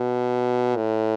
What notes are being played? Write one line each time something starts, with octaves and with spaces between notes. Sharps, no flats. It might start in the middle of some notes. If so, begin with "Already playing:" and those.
Already playing: B2
A2